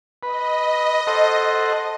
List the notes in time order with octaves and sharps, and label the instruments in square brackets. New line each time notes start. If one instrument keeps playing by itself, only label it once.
[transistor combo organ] B4 [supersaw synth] D#5
[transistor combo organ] A4 C5 F#5